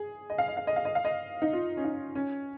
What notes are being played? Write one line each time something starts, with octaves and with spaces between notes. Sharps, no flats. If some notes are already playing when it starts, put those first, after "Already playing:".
Already playing: G#4
D#5
F5
D#5
F5
D#5
F5
D#5
F5
D#5
D#4
F4
C#4
D#4
C#4